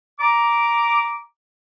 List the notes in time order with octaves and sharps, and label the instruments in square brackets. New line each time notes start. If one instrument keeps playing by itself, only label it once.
[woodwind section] A#5 D6